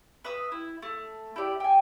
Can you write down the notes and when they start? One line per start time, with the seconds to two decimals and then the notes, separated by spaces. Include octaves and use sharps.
0.24 B4 E5 D#6
0.52 E4
0.82 A3
1.36 E4 G4 D5
1.60 G5 G#5